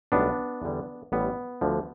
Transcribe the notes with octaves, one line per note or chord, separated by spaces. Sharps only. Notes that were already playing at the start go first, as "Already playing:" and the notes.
B1 A2 G3 B3 D4
E2 D3 G3
A1 A2 G3 B3
D2 D3 F3